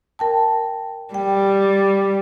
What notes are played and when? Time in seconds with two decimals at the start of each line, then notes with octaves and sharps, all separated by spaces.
0.19 A#4 G5 A5
1.14 G3 G5